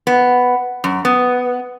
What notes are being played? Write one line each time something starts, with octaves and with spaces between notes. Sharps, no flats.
B3
F#2
B3